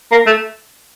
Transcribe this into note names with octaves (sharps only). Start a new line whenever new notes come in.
A#3
A3